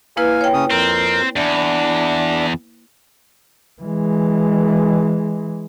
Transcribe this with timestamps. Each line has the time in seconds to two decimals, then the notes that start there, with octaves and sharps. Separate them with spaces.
0.17 A#3 E4 B4 F5 G#5
0.41 C#5 G5
0.54 C#3 C#4 D#6
0.71 F2 C4 A#4 G6
1.36 E2 D4
3.82 E3 G#3